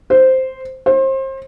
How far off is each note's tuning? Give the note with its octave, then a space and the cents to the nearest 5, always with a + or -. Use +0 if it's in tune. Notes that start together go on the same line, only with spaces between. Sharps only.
C5 -5
C5 +30